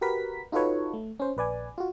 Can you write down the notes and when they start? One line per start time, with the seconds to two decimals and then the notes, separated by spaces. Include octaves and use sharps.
0.01 F#4 G4 A#4 B4 B6
0.52 D#4 F4 F#4 A4 B4 C#5
0.94 A3
1.20 C#4 C5
1.37 A#1 B4 D5 G#5
1.78 F4 F#4